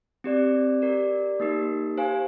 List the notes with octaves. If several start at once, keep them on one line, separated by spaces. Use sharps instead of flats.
C4 G4 D5
G4 A#4 D5
A#3 D#4 G4 A#4
G4 C5 F5 G#5